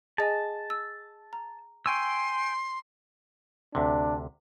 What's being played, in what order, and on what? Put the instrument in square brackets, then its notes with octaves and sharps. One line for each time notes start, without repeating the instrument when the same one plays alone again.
[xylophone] G#4 D#5 G#5 [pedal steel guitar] A5
[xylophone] E6
A#5
[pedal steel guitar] G5 G#5 E6 [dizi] C6 [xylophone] C#6
[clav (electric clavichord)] D2 C3 [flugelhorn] D4